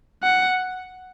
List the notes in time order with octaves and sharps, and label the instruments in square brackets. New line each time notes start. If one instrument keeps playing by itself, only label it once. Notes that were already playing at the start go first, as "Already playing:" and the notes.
[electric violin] F#5